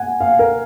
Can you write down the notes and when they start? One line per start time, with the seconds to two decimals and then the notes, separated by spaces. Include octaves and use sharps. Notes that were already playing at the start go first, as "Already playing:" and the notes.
Already playing: F#5 G#5
0.20 F5
0.39 A#4